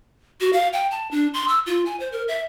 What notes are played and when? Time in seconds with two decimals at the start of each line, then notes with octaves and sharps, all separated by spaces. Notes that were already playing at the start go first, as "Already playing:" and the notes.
0.41 F#4
0.53 F5
0.73 G5
0.91 A5
1.11 D4
1.34 C6
1.48 E6
1.66 F4
1.86 G#5
2.00 C5
2.12 A#4
2.28 E5